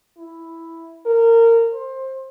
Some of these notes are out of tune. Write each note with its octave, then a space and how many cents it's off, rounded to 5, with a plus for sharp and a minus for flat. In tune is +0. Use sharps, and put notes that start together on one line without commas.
E4 +0
A#4 -20
C5 +20